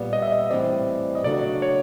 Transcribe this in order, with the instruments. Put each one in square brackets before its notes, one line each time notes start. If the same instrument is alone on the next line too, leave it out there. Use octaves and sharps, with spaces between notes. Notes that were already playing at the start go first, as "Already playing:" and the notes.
Already playing: [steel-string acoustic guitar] A#2 G3 B3
[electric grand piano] D#5
E5
D#5
[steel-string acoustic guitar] A2 E3 G3 C4 [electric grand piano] D5
[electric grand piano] D#5
[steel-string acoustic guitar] C#3 F#3 A3 D4 F#4 [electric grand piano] D5
[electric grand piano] C#5